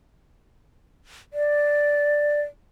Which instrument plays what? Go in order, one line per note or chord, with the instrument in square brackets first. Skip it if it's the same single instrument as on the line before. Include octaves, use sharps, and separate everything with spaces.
[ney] D5